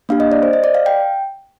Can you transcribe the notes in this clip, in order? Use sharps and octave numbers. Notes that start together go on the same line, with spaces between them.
A#3 D4 G4 F5
D#5
D5
C5
D#5
D5
F5
G5